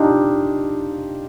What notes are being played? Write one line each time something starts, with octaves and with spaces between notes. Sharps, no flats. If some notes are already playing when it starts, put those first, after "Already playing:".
Already playing: D4 D#4 F4 G4